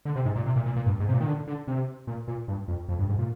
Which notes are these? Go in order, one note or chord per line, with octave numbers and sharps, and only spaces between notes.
D3
C3
G#2
A#2
C3
A#2
A#2
A#2
G2
G#2
C3
A#2
D#3
D3
D3
C3
A#2
A#2
G2
F2
F2
G2
G#2
A#2